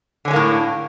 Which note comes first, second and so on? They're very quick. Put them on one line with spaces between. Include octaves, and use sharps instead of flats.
D3 C#4 G#3 A#3 A2